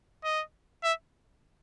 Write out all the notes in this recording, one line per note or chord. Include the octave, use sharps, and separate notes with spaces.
D#5
E5